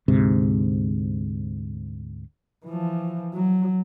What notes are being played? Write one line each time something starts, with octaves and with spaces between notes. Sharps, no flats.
D2 G#2 C3
E3 F3
F#3